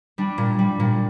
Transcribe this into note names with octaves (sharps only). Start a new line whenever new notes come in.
G3 D4
A#2
G3
A#2